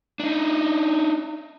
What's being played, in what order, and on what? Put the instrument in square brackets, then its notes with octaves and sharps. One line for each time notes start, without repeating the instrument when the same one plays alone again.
[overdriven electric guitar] D4 D#4